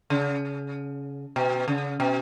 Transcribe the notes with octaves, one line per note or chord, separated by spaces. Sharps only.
C#3
B2
C#3
B2